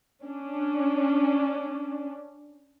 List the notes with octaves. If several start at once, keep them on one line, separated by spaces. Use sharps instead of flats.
C#4 D4